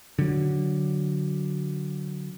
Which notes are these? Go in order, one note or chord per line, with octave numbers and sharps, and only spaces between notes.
D3 F#3